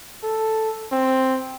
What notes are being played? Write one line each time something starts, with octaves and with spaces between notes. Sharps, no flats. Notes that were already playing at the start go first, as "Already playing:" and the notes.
A4
C4